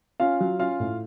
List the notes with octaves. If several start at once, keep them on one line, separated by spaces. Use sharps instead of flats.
C#4 F4 F5
F#3
C#4 F4 F5
A2